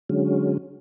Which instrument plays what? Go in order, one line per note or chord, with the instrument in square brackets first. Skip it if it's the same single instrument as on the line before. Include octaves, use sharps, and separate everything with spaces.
[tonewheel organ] D3 F#3 G#3 C#4